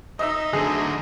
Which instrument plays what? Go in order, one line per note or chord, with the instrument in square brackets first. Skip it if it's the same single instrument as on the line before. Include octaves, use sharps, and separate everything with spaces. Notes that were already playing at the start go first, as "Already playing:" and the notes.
[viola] D#4 [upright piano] D#5 E5 E6
[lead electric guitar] D3 F#3 [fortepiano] G#4 A4